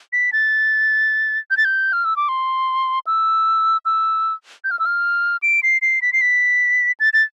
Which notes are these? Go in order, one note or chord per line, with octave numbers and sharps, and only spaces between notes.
B6
A6
G6
A6
G6
F6
E6
D6
C6
E6
E6
G6
F6
E6
F6
D7
C7
C7
B6
C7
B6
A6
A6